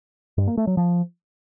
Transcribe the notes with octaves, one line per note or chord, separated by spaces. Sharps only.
G2
A#3
A3
F#3
F3